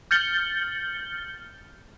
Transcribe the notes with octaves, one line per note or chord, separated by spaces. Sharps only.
F6 G6 A6 C#7 F#7 G7